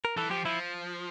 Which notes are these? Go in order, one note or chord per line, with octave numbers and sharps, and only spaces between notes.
A#4
E3 A4
F3 G4
F3 E4